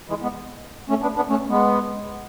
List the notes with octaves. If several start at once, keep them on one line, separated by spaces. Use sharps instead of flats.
E3 G#3
G#3 B3
A3 C#4
B3 D4
B3 D4
A3 C#4
G#3 B3